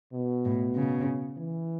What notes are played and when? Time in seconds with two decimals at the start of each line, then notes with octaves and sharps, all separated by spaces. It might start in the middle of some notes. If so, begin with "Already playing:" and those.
0.14 B2
0.45 A2
0.76 C#3
1.38 E3